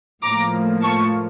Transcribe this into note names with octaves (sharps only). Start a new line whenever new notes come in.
A2 F3 A#3 A#5 D6
A5 C#6